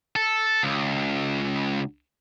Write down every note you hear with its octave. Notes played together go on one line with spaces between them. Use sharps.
A4
C#2